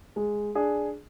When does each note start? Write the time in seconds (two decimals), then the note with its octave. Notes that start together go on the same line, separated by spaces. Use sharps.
0.16 G#3
0.55 D4 G#4